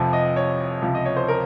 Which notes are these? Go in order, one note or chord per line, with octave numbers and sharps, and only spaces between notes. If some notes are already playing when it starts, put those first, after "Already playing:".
Already playing: F1 F2 C3 F3
D#5
C#5
C#2 C3 F3
D#5
C#5
C5
A#4